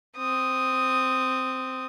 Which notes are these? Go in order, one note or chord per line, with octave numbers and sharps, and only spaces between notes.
C4 D#6